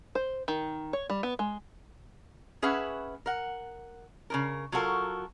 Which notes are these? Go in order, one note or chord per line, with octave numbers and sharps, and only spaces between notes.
C5
D#3
C#5
G3
B3
G#3
C#4 G#4 B4 E5 F#5
A#4 F#5
C#3 F3 A#4
F#3 F4 F#4 A4 A#4